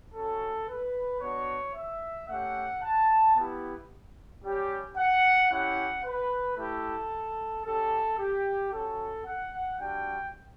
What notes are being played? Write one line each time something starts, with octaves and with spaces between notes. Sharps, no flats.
C#4 F#4 A4
B4
B3 D4 F#4 C#5
E5
A3 C#4 G4 F#5
A5
B3 E4 G4
G3 C#4 G4
F#5
C#4 E4 G4 F#5
B4
A3 E4 G4 A4
C#4 G4 A4
G4
C#4 F#4 A4
F#5
G3 D4 F#4 G5